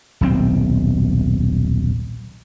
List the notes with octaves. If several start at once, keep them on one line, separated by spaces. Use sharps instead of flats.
D#1 B1 C4